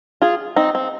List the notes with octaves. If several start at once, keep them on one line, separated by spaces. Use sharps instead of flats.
F4 G#4
C4 D#4
C4